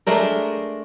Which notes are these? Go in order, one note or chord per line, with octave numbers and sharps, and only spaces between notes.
G#3 A3 D4 A#4